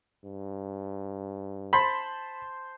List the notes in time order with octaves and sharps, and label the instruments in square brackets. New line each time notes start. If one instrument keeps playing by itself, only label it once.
[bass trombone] G2
[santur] C5 A5 C6 [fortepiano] B5